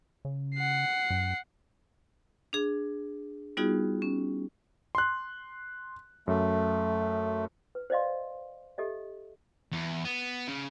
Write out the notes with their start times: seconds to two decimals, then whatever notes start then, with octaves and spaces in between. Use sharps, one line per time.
0.25 C#3
0.55 F#5 C7
1.10 F#2
2.53 D4 G#4
3.57 G3 B3 D#4 F4 F#4 G#4
4.02 C#4
4.95 C6 F#6
6.27 F#2 A3
7.75 B4
7.90 C5 D5 D#5 F5 C6
8.78 G4 A4 D#5 E5
9.72 E2
10.05 B3
10.48 C#3